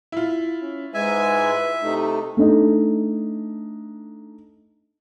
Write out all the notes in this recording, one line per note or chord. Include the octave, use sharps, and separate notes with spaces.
E4 F4
C#4
G#2 G#3 B4 E5 G#5
C3 A3 D#4
A3 D4 D#4